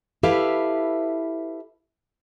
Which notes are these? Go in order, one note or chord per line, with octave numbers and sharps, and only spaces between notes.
E4 G4 A4 B4 E5 F5